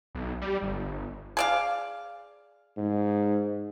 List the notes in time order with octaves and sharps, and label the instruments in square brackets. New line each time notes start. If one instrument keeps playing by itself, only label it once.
[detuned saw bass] B1
G3
G1
[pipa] G#4 D5 F5
[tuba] G#2